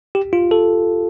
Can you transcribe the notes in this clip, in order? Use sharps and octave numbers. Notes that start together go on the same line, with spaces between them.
G4
F4
A4